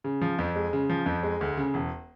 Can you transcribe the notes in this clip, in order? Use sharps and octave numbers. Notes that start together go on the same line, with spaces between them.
C#3
F3
F2
G#3
C#3
F3
F2
G#3
D2
C#3
E1